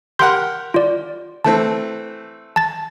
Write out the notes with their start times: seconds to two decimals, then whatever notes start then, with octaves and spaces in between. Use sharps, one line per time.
0.19 G4 A#4 F#5 C6 G6
0.74 F4 D5
1.45 E3 A3 C4 A5
2.56 A5 A6